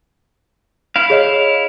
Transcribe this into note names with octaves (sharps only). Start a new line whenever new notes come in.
E4 F5
G#4 C#5 D#5